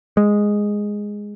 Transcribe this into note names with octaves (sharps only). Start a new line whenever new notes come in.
G#3